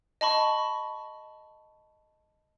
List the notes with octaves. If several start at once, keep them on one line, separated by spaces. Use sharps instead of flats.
D#5 A5 B5 C#6